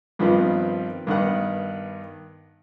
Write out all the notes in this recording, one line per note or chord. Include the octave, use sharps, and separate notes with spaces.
G2 D#3 F3 B3 C4
G2 D#3 B3 F#5